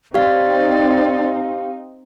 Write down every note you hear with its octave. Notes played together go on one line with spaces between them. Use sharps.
C4 D#4 G4 D5 F5